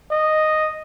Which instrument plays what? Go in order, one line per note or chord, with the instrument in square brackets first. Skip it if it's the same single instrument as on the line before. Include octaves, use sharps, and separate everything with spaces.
[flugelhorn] D#5